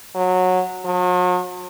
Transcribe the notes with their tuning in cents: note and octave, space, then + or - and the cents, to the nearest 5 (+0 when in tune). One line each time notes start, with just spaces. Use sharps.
F#3 -15
F#3 -45